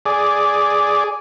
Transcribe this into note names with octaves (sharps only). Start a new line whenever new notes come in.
G#4 D5